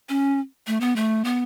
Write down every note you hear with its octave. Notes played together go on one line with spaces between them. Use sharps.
C#4
A3
B3
A3
B3